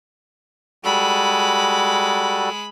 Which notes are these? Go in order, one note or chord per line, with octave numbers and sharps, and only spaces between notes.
G3 G#3 F#4 A4 B5